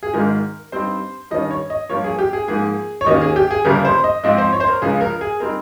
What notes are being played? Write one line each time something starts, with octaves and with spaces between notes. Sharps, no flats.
G#4
G#1 G#2 D#3 G#3 A#4
G2 G3 C4 D#4 C5
G2 D#3 G3 C#4 D#5
C#5
D#5
G2 F3 A#3 C#5
G#4
G4
G#4
G#2 F3 A#3 G#4
C#5
D#2 D#3 A#3 C#4 D#5
G#4
G4
G#4
G1 F2 C#3 G3 A#3 A#4
C5
D#5
G#2 F3 C4 D#4 D#5
C5
C#5
C5
A#4
C#2 C#3 F3 G#4
A#4
G#4
G3 C4 D#4 A#4